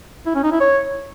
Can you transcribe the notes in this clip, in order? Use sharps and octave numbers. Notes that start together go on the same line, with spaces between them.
E4
C#4
D#4
E4
C#5